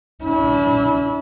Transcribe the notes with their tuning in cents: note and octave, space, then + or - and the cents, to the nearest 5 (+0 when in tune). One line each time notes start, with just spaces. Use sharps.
C#4 +45 E4 -30